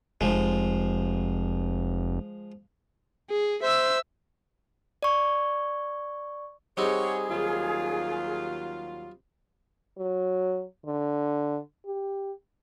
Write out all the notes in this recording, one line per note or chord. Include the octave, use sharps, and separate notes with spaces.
F1 F3 G#3
G#4
C5 E5 E6
D5 C#6
G3 C4 D#4 G#4 C#5 F#5
D#2 F#3 F4
F#3
D3
G4